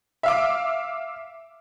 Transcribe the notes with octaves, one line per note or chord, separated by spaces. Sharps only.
E5 F5 D6